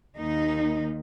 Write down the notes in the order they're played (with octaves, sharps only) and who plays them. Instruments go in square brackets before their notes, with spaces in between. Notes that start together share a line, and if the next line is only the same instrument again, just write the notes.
[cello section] D#2 D#3 D#4